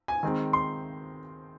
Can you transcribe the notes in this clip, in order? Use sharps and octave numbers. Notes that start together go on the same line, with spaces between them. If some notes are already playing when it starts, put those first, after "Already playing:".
G#5
D#3 G#3 C4
C6